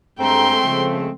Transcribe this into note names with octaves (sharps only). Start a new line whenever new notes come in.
G2 G#3 A3 C4 G5 A#5 C6
C#3 F3